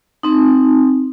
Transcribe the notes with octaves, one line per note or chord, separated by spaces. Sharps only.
C4 D#4